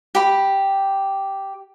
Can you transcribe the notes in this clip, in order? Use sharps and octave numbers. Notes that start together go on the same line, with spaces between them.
G4 B5